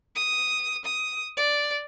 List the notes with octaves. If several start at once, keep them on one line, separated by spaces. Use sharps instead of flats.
D#6
D#6
D5